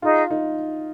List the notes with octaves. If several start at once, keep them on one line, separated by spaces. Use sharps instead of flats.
D#4 F4 G#4 D#5
D#4